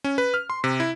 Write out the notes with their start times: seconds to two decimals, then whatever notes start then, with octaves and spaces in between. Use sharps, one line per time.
0.04 C#4
0.18 B4
0.34 F6
0.50 C6
0.64 C3
0.80 E4